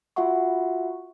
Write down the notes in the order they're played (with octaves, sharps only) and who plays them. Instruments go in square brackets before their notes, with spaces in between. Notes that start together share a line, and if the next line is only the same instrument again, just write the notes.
[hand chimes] F4 F#4 E5 F#5 C#6